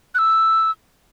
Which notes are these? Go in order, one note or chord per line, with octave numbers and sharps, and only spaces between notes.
F#6
E6